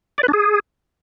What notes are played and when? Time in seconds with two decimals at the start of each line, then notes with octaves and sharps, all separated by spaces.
0.18 D5
0.23 B4
0.28 D4
0.33 G#4